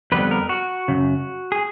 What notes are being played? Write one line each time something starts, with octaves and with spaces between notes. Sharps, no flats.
F2 D3 G3 B3 B4
A#4
F#4
F#2 C#3
G#4